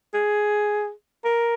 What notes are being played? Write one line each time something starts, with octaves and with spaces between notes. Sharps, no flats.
G#4
A#4